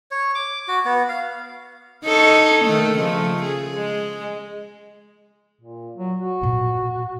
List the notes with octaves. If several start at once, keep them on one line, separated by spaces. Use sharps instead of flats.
C#5
D6
F#4
B3
F5
D#4 A4 C#5
D#3 A3
C#3 F3 A3
G#4
G#3
A#2
F#3
F#4
A#2 F4